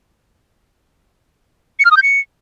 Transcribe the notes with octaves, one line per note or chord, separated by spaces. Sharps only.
C#7
F6
D#6
G6
C#7